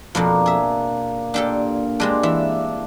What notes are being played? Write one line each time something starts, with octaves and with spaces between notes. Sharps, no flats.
F2 B2 F3 A#3 D4
G#4 E5
A#2 D4 G4 A4
G3 G#3 C4 D4
E3 E5